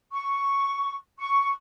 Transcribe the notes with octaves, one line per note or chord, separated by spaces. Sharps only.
C#6
C#6